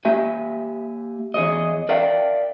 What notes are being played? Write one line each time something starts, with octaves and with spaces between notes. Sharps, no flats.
A#3 G4 E5 G#5
E2 G#4 C#5 D#5
A#4 D5 E5 F5 G5 A5